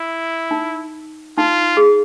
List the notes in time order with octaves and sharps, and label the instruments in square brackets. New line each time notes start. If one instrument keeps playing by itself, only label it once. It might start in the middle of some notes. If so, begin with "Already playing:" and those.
Already playing: [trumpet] E4
[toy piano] D#4
[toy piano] D#4 [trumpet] F4
[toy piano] G#4